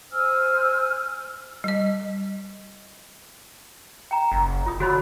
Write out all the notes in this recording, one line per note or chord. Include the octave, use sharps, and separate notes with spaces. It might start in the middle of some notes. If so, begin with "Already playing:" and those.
C5 G#5 E6 F6
G3 D#5
G5 A#5
F#1
F4 D#6
D3 F#4 C#5 B5